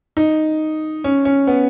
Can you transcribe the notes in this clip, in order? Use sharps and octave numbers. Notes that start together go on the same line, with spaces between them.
D#4
C#4
C#4
B3